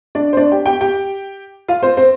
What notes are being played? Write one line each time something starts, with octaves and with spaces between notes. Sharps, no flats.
D4 D5
C5
D4 D5
G4 G5
G4 G5
G4 G5
F4 F5
C4 C5
C4 C5